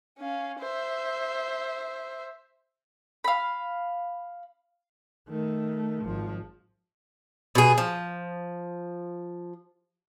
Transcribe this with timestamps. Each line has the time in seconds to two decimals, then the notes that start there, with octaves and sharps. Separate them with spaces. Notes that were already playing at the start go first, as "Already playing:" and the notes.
0.18 C#4 F5
0.59 C5 E5
3.24 F5 B5
5.29 D#3 A3
6.05 G#1 F3
7.55 B2 G#4
7.78 F3